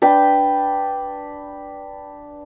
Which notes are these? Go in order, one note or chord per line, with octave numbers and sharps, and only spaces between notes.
D4 B4 G5